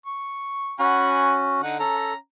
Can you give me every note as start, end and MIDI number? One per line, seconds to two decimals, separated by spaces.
0.06 0.74 85
0.79 1.61 61
0.79 1.61 66
0.79 1.37 78
0.79 1.37 80
0.79 1.37 83
1.62 1.80 50
1.62 1.80 63
1.62 1.80 78
1.80 2.15 61
1.80 2.13 69
1.80 2.15 82